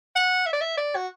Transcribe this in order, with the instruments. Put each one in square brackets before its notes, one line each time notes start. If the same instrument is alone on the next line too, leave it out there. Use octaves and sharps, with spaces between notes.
[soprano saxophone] F#5
E5
D5
E5
D5
F#4